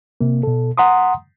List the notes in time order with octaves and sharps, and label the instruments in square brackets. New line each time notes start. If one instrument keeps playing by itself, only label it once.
[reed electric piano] C3 A#3
B2 A4
F#5 A#5 C6 D#6